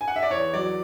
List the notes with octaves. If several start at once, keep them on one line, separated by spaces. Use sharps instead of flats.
G#5
F#5
E5
D5
E2 C#5
F#3 D5